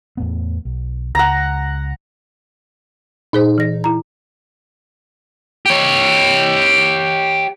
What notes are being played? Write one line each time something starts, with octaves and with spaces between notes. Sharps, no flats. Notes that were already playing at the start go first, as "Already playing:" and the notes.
E2 A2 B3
B1
C#2 F#5 A#5
A#2 D#4 G#4 C5
E3 A#6
E4 A#5
G4 C#5